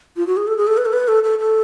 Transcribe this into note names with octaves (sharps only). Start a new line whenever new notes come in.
F4
F#4
G#4
A4
G#4
A4
B4
A4
B4
A4
A4
A4